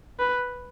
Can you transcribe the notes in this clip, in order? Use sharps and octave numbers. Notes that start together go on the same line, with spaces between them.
B4